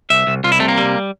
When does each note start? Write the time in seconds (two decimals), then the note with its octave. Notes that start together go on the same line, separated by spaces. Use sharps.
0.10 C2 E5
0.27 C2
0.44 C2 F4
0.52 E4
0.59 C3 A3
0.68 A#3
0.77 G3